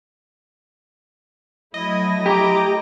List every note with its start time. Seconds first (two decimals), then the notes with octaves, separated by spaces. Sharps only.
1.74 F#3 A3 E4 D#5
2.26 G4 A#5 D6